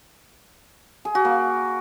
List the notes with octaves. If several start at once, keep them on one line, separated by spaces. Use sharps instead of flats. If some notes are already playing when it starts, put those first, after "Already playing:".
G#4
F#4
A#3